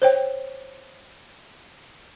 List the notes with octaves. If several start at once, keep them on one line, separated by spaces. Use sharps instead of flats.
C5 C#5 G5